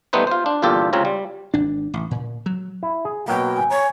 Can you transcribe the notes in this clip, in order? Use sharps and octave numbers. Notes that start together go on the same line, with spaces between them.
G3 A3 B3 D#4 B4 C5
F4 C5
D4
G1 E2 A#2 F4 G4 A4
C#2 C#3 C4 F4 C#5 A#5
G3
G#1 D4
A1
A#2
F#3
E4
G#4
B2 F#3 A#3 G5
G#5
C#5 A#5